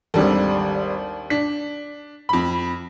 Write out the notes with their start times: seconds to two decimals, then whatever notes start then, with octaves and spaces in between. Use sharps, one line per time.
0.14 G#1 D#2 G3 D4 A4
1.30 D4 B6
2.29 F2 B5